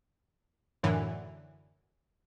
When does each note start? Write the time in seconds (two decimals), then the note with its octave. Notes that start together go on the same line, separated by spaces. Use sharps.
0.83 F#2 A2 D3 E3